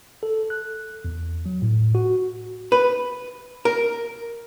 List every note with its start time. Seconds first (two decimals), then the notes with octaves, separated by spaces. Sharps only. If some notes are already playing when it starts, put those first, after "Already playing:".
0.23 A4
0.50 F#6
1.05 E2
1.46 F#3
1.62 A2
1.95 F#4
2.72 B4
3.65 A#4